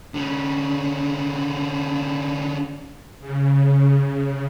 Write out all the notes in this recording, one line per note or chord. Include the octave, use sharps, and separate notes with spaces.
D3 C#4
C#3